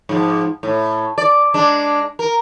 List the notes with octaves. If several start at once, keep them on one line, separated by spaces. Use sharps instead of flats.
G#2 F3
A2
D5
G#3 D4
A#4